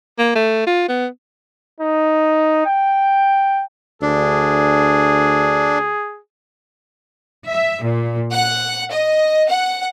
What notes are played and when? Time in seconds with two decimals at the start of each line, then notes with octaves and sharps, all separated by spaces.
0.18 A#3
0.35 A3
0.67 F4
0.89 B3
1.80 D#4
2.66 G5
4.02 D2 D4 G#4
7.48 E5
7.83 A#2
8.33 F#5
8.91 D#5
9.50 F#5